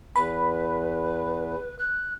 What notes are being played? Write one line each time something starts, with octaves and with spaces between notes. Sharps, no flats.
E2 B4 B5
F#6